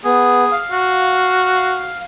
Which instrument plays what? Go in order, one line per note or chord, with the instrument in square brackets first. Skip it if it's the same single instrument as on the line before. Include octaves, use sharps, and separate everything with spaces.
[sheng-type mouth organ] B3 [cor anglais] G#4
[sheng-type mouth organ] F5
[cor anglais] F#4